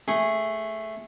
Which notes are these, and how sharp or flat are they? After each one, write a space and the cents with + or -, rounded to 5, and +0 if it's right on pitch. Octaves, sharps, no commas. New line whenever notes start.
A3 +0 G#4 -10